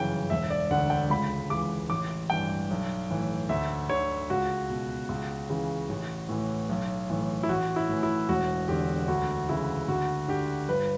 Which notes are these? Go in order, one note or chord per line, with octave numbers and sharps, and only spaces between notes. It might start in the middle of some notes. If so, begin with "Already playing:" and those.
Already playing: G1 F#2 C#3 E3 G5
E1 E5
D5
D2 D3 F#5
G5
C#2 B5
C#3 E3 D6
A1 D6
G2 E3 G5
B1
A2 E3
D2 E5
D3 C#5
C#2 F#4
B2
C#2
C#3 E3
A1
A2 E3
B1
A2 E3
E4
A1 F#4
E4
A2 E3
E4
E1 F#4
E2 D3 G4
D2 F#4
C#3 E3 E4
D2 F#4
D3 G4
G1 B4